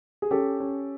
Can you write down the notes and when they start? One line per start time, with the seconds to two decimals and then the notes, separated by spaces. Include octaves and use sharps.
0.22 G#4
0.31 C#4 G4 A4
0.60 C#4